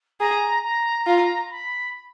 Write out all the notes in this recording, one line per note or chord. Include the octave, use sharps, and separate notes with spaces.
G#4 A#5
A#5
F4
B5